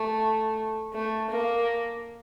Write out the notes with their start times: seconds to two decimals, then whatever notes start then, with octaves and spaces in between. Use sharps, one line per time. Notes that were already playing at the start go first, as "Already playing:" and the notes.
Already playing: A3
0.93 A3
1.30 A#3